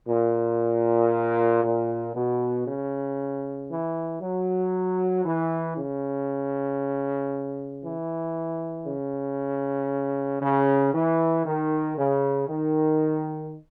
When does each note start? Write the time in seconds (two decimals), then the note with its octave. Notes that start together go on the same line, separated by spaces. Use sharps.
0.09 A#2
1.64 A#2
2.15 B2
2.67 C#3
3.70 E3
4.22 F#3
5.25 E3
5.77 C#3
7.84 E3
8.87 C#3
10.42 C#3
10.94 E3
11.46 D#3
11.98 C#3
12.49 D#3